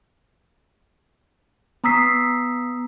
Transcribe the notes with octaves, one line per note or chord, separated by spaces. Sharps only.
B3 A#5 D#6 E6 B6 C7